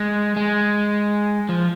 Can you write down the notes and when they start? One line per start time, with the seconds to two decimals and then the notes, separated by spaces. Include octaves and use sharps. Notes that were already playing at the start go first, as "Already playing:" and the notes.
Already playing: G#3
0.36 G#3
1.49 F3